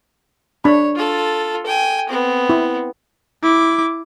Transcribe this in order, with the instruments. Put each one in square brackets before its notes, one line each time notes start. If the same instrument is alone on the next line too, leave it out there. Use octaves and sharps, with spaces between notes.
[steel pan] D4 B5 [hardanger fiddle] C#5
[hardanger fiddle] F4 A4
G5 G#5
B3 C4
[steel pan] E4
[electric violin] E4 D6